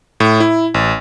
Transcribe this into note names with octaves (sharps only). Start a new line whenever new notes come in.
A2
E4
A1